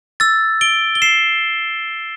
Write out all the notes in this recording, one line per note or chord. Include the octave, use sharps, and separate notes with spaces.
E6 A6
D7 G7
G7
C7 E7